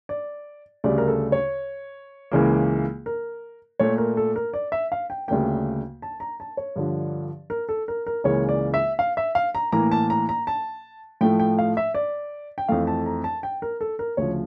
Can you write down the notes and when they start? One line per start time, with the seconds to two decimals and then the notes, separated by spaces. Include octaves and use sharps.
0.09 D5
0.84 D2 C#3 G3 D5
0.98 A#4
1.08 A4
1.32 C#5
2.31 C#2 C#3 E3 A#3
3.06 A#4
3.80 A#2 A3 C#5
3.98 A#4
4.17 A4
4.36 A#4
4.54 D5
4.72 E5
4.92 F5
5.10 G5
5.28 D2 C#3 G3 A#3 G5
6.02 A5
6.20 A#5
6.40 A5
6.57 C#5
6.76 G2 D3 F3
7.50 A#4
7.69 A4
7.88 A#4
8.06 A#4
8.24 C#2 C#3 E3 A#3 C#5
8.49 D5
8.74 E5
8.99 F5
9.17 E5
9.35 F5
9.55 A#5
9.72 A2 E3 A#3 A#5
9.92 A5
10.10 A#5
10.29 A#5
10.47 A5
11.21 A2 F3 A3 G5
11.40 G5
11.59 F5
11.77 E5
11.94 D5
12.58 G5
12.69 F2 E3 A3 F5
12.87 A5
13.06 A#5
13.24 A5
13.43 G5
13.62 A#4
13.81 A4
13.99 A#4
14.17 D2 C#3 F3 C#5